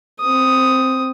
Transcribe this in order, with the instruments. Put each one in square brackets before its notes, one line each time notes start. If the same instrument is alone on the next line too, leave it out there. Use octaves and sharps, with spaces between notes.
[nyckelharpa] C4 D#6